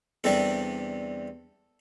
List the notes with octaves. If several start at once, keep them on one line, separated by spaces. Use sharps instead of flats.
E2 C3 G3 D4 A4